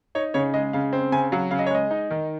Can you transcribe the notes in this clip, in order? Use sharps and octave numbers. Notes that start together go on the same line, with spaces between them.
D#4 C#5
C#3 C#5
G#3 D#5
C#3 F5
C4
C#3 G#5
F#3 F5
C#3 F5
D#5
C#5
G#3 D#5
D#4
D#3